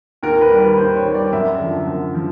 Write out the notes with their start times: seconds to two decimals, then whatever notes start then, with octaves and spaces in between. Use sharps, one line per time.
0.22 D#2 A#4
0.41 B4
0.51 D#3 G3
0.60 B4
0.74 B4
0.77 D#2 C5
0.96 C#5
1.05 D#3 G3
1.14 D5
1.33 F#2 E5
1.59 D3 F3
1.87 F#2
2.15 F3